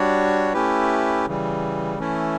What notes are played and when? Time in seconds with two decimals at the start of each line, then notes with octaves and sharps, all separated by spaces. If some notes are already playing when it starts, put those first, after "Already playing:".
Already playing: G3 D4 F#4 C#5
0.53 A3 C#4 E4 G4 B4
1.26 C#3 E3 G3
1.99 E3 A3 C#4 E4